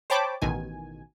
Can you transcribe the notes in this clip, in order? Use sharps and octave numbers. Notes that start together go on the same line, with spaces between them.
C5 C#5 G5 A5 B5 D6
A1 B2 D#3 G#5